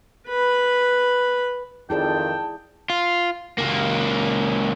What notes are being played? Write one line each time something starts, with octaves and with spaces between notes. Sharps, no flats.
B4 B5
F2 D#3 E4 G#4 D5 G5 A5
F4
C#2 A#3